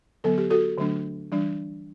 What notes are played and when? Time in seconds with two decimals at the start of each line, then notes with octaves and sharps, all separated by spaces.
0.24 D3 F#3 B3 A4
0.38 G4
0.50 F#4 A4
0.78 D3 F#3 A3 D4
1.32 E3 G3 D4